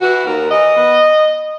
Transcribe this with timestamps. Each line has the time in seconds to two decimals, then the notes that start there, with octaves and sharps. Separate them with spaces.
0.01 E3 F#4
0.25 D#2 A#4
0.51 E3 D#5
0.76 B3